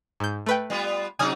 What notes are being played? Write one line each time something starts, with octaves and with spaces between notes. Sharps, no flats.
G#2 G6
A3 B4 G5
G3 B3 F4
C3 F#3 D#4 G#5 D#6 F6